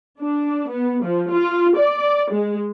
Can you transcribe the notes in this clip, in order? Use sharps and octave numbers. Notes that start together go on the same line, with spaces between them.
D4
B3
F3
F4
D5
G#3